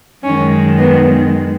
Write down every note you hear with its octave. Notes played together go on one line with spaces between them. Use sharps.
F#2 D#3 G#3 C#4
B3